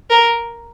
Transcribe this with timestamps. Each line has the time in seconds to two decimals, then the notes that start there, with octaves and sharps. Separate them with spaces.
0.10 A#4